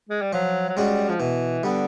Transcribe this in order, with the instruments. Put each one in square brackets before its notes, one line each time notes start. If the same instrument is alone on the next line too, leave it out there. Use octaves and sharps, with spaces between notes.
[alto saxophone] G#3
G3
[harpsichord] F3 [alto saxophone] F#3
[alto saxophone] F#3
[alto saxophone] G3 [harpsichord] G#3 C#4 F#4
[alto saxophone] F3
[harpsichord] B2 [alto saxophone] E3
[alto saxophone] D3 [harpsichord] G3 B3